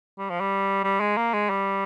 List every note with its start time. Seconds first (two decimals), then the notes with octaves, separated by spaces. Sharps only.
0.18 G3
0.30 F3
0.40 G3
0.84 G3
1.00 G#3
1.17 A#3
1.33 G#3
1.50 G3